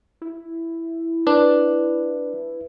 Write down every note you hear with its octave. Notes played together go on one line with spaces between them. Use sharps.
E4
D4 B4